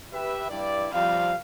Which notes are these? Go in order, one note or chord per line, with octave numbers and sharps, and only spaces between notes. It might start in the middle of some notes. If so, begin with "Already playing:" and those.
G4 B4 E5
G2 E4 D5
F3 G3 C4 F5